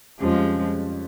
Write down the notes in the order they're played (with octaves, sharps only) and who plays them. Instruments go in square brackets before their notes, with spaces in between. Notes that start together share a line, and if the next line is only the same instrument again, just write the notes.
[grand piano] F2 C#3 G3 C#4 F4 [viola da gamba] F3 G#3